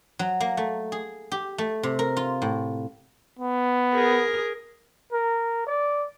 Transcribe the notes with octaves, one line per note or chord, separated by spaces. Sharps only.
F#3
A#3
A3
G#4
G4
A3
C3
A#4
F4
A2
B3
G#4 A#4
A#4
D5